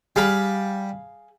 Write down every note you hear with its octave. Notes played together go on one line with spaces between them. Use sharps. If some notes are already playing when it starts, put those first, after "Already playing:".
G3 G#4 F5 B5